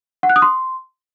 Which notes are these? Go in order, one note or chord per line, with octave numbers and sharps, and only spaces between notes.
F#5
F#6
D#6
C6